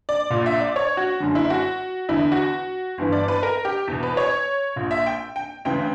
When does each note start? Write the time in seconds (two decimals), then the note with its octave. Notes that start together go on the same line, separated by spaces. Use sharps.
0.09 D5
0.30 A#1 A#2
0.46 E5
0.61 D5
0.76 C#5
0.97 F#4
1.20 F#1 F#2 D3
1.35 E4
1.50 F#4
2.09 E2 D3 E4
2.32 F#4
2.98 G1 G2 E3
3.12 D5
3.28 B4
3.43 A#4
3.65 G4
3.88 E2 B2
4.03 B4
4.17 C#5
4.76 A#1 A#2
4.91 E5
5.06 G5
5.36 G5
5.65 D2 C#3 E3 G5